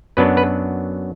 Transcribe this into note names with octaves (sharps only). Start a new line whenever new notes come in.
F#2 F#3 B3 D4 B4
B4